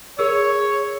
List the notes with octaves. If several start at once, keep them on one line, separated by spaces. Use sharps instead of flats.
G#4 A#4 C#5 E6